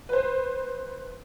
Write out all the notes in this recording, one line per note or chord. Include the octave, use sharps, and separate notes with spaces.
B4 C5